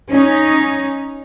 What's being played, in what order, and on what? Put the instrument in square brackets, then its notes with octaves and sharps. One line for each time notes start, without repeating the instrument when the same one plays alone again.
[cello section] C#4 D#4